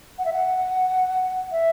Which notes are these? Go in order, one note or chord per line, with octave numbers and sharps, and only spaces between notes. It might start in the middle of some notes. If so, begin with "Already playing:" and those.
F#5
E5
F#5
E5